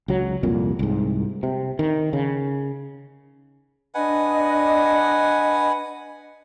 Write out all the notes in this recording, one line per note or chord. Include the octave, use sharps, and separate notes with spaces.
C#2 F#3
C2 F2 A#2
C2 G#2
C3
D#3
C#3
D4 B4 D#5 F#5 G#5